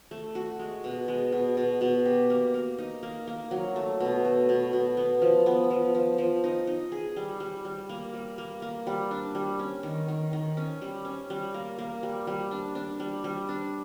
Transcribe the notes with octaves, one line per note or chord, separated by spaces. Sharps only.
A3
F#4
G#3
B2
G#3
B2
B2
B2
G4
A#3
A#3
D#4
A#3
A#3
F#3
A3
B2
A3
B2
B2
B3
F3
B3
F3
F3
F3
D#4
D#4
G#4
G3
G3
G3
A#3
G3
A#3
A#3
G3
D4
G3
C#4
D#3
D#3
D#3
C#4
G3
C#4
G3
A#3
A#3
G3
G3
D4
D4
G3
G3
D4